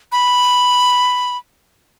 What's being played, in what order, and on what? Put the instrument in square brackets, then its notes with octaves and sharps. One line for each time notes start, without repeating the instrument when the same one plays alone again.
[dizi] B5